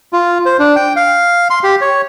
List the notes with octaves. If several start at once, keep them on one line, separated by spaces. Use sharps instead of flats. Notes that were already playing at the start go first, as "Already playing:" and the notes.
F4
C5
D4
G5
F5
C6
G4
C#5